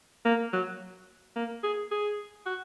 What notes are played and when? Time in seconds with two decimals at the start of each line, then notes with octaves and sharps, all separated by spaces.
0.25 A#3
0.53 F#3
1.36 A#3
1.63 G#4
1.91 G#4
2.46 F#4